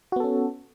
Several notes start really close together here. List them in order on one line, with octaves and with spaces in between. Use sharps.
F#4 B3 A4 C#4